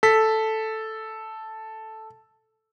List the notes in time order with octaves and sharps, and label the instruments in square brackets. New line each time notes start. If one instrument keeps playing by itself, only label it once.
[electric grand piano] A4 B6